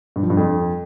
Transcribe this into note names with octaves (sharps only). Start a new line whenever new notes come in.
G2
F3
G2
F2